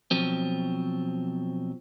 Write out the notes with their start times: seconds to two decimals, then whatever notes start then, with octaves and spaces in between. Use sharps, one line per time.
0.11 B2 F3 F#3 C4